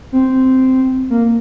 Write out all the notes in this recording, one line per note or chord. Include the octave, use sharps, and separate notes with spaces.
C4
A#3